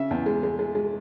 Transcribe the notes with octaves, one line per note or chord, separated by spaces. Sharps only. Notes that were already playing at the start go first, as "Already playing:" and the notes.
Already playing: C#3 E5
E2
G#3
G#3
G#3
G#3